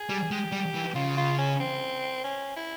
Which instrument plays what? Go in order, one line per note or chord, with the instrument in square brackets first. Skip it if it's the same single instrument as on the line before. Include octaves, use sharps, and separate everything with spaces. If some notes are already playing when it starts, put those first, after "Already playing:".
Already playing: [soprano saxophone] G#4
[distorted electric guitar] G3
[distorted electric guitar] G#3 [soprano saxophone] G4
[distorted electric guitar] G3
E3
[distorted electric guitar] C#3 [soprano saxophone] F4
[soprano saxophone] F4
C#4
C4
C#4
E4